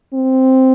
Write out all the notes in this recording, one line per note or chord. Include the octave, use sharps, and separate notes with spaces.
C4